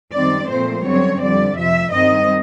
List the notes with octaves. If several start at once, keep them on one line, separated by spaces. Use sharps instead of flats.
F#2 D#3 G3 C4 D5
A#2 F3 A3 C4 C5
F#2 D3 G3 C4 C#5
F2 D3 G3 D5
F2 C3 F3 E5
G2 D#3 G3 C4 D#5